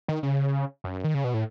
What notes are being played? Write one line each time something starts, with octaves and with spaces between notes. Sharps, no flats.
D#3
C#3
F#2
D#3
C#3
B2
A2